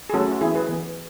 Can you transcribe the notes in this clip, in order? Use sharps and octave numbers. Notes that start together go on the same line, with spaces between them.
G#4
F#3 A3 C#4 F#4 A4
F#4
E3 B3 E4 G#4
G#4 B4
E3 B3